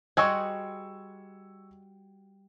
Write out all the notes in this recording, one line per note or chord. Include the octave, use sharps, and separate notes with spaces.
G3 F#4 G#4 C5 D#5 C#6 E6 G#6